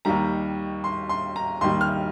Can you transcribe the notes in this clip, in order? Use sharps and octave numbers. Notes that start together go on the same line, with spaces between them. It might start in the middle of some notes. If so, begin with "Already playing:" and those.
D#2 D#3 G3 A#5
C6
C6
A#5
D#2 D#3 G3 C6
F6